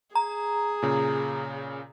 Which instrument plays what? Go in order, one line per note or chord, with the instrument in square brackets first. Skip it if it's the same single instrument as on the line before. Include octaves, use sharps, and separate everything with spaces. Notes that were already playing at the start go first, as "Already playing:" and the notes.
[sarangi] G#4 [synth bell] A#5
[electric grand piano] A#2 C#3